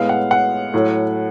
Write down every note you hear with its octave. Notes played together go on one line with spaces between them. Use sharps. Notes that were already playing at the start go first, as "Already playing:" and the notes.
Already playing: A2 G#3 B3 F5
F#5
F#5
A2 F#3 A3